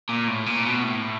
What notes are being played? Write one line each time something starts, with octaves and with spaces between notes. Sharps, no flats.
A#2
A2
A#2
B2
A2